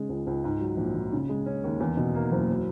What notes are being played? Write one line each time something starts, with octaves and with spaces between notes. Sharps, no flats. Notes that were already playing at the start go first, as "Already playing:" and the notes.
Already playing: C#3 G#3
C#2
C#2
G#2
F#3
A#1
A#1
C#3
G#3
C#4
D#2
E2
B2
A#3
F#1
F#3